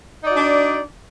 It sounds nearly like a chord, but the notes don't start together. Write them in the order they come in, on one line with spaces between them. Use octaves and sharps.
D#4 D5 F#4 D4